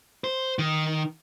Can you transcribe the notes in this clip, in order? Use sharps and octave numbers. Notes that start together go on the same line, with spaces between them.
C5
D#3